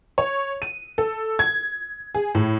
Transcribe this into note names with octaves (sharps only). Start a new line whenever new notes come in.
C#5
D#7
A4
G#6
G#4
A2